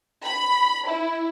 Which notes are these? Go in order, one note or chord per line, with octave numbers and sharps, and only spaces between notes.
B5
E4